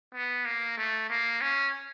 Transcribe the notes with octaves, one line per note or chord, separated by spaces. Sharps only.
B3
A#3
A3
A#3
C#4